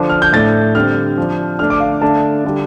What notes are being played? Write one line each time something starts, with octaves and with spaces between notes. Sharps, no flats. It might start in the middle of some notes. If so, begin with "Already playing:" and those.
Already playing: D3 F3 D4
F6
G6
A2 A3 D4 A6
D3 G3 C4 F6
F3 D4
D3 A3 D4 F6
D6
F5
D3 A3 D4 A5
D3 G3 D4